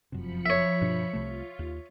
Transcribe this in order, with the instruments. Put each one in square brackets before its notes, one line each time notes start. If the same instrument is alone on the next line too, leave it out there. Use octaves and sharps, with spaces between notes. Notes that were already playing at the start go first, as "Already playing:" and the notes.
[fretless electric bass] F1 F#2 C3 [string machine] F3 B5 C#7
[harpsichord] C#5 E5
[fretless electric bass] G2 B2 D4
[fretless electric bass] C2 C3 A3 [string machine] F4
[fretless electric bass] D#2